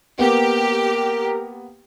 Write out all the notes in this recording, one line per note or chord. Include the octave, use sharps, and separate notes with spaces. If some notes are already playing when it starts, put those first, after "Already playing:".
A#3 B3 G4 A#4